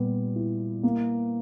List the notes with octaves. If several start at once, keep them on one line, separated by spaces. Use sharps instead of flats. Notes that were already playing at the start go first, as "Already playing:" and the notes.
Already playing: A#2 G3 B3
E4
A#3